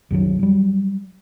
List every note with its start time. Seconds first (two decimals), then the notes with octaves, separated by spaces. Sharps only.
0.11 C2 F#2 D#3 F#3
0.39 F#3 G3